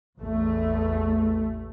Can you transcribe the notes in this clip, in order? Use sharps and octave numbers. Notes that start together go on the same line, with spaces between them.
A1 E2 A3